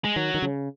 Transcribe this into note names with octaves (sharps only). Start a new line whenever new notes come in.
G#3
D#3 F#3
D#3
C#3